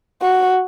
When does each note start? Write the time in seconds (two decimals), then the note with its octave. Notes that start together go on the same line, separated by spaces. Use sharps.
0.22 F#4